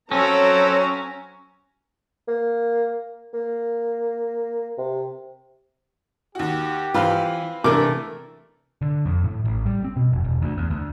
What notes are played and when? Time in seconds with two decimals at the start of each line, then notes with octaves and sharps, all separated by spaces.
0.11 F#3 C4 C#4 A4 C#5 A#5
2.28 A#3
3.34 A#3
4.78 C3
6.35 D#2 F#4 G4
6.94 E3 C4 F4 B4 F5
7.64 C3 E3 A3 D4 A#4 D6
8.82 D3
9.06 F2
9.24 A2
9.45 A1
9.66 G3
9.84 C4
9.97 B2
10.12 F1
10.24 E1
10.42 D2
10.58 E2
10.70 D2